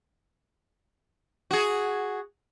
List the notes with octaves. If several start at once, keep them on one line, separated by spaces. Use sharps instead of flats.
F#4 G#4